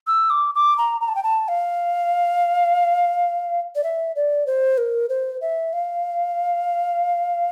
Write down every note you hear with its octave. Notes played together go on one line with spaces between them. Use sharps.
E6
D6
D6
A#5
A#5
A5
G5
A5
F5
D5
E5
D5
C5
A#4
C5
E5
F5